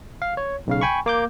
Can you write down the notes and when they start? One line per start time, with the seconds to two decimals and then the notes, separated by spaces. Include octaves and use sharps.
0.22 F5
0.37 C#5
0.67 B1 C#3 F5
0.81 G5 G#5 B5 C#6
1.06 A#3 D6 G6